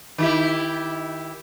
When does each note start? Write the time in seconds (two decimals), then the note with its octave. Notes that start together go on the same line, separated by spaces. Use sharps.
0.18 D#3 E4 G4